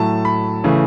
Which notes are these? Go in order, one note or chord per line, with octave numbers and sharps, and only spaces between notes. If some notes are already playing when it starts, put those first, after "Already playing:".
Already playing: A2 F#3 A3 A5
B5
C#3 E3 A3